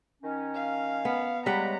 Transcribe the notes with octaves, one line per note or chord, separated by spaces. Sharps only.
D#3 C#4
F5
B3
C#3 G3 G#3 B4 F#5 A#5